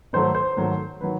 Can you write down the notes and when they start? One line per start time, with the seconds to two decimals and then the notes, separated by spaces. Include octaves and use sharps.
0.13 G#2 D#3 F#3 A3 C5
0.35 C5
0.57 G#2 D#3 F#3 A3
1.01 D#3 F#3 B4